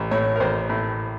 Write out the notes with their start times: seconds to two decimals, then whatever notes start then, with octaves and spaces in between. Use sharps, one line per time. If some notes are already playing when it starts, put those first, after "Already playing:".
Already playing: A1
0.11 A2 C#5
0.36 A#4
0.40 A1 C5
0.69 A2